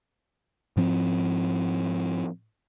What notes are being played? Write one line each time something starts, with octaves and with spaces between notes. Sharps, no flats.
G#2 F3 C4